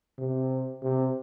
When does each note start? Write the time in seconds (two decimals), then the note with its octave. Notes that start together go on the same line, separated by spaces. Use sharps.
0.18 C3
0.83 C3